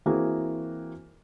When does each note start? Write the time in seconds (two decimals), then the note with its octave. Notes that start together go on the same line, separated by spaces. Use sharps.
0.06 E3 A#3 C4 F#4 G#4